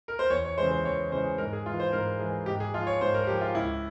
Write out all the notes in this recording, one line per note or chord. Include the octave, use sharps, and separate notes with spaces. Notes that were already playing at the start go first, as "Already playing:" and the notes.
A#4
C5
E2 C#5
C#5
C#3 E3 G#3 C5
C5
E2 C#5
C#3 E3 G#3 C5
G#2 A#4
G#4
E3 G#3 F4
C5
G#2 A#4
E3 G#3 G#4
G#2 G4
G#4
F3 G#3 F4
C#5
G#2 C5
A#4
F3 G#3 G4
F4
C#2 E4